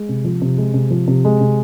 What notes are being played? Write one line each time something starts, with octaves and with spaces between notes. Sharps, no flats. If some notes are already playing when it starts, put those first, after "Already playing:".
Already playing: G#3
C3
F3
C3
G#3
C3
F3
C3
G#3
C3